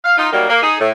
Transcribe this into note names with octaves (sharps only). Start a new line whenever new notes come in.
F5
D#4 F4
D#3 F#3 G3 A#3
A#3
D#4 G#4
A2